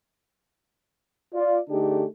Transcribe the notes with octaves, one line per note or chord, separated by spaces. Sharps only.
F4 D5
D3 A3 D4 D#4 G4 G#4